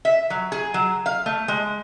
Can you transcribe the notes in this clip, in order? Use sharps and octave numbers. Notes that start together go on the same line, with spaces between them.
E5
F#3
G#4
F#3
F5
A3
G#3